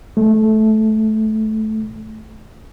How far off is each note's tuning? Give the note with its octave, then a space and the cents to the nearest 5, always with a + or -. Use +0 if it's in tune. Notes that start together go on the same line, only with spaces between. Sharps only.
A3 -15